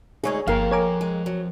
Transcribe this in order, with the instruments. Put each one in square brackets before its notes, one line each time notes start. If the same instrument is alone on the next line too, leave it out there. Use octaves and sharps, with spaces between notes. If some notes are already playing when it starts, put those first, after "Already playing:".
[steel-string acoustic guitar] D2 G#3 D#4 [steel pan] G#4 C#5
[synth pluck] G1 [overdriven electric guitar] F3 G5 [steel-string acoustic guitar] A#3 [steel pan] A#4 F5
[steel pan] A#4 [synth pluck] C#5 G#5 D6
[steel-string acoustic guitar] G#3
F#3